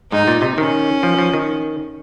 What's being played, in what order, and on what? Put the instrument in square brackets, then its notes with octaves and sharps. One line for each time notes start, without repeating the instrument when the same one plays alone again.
[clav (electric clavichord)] G#2 [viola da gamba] D#4
[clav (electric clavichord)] A#2
C3
[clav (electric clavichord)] D#3 [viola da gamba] C#4
[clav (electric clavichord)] F3
F3
D#3